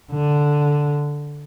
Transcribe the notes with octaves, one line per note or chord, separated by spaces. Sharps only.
D3